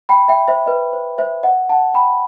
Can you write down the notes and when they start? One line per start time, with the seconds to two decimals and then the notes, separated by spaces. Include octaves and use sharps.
0.09 G5 B5
0.28 E5 G5
0.48 C5 E5
0.66 B4 D#5
0.93 C5
1.18 C5 E5
1.43 D#5 F#5
1.69 F#5 A5
1.94 G5 B5